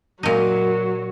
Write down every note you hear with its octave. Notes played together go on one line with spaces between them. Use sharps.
A#2 F#3 D#4